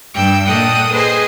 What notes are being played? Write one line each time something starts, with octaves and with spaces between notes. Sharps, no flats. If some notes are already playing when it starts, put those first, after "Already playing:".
G2 G5 E6
A#2 A4 D#5 F#5 G5 D#6
G#4 B4 C5 D#5 G#5